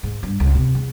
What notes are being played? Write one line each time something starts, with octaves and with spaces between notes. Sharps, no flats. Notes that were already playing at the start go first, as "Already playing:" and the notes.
G#2
G2
C#2
C3
E2